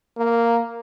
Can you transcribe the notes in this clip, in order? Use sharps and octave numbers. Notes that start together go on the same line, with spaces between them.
A#3